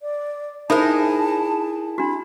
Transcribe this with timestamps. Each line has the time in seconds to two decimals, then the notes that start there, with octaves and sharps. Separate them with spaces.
0.01 D5
0.70 D#4 E4 G#4 A#4 C5 E5 A5 B5
1.98 D4 F#4 B5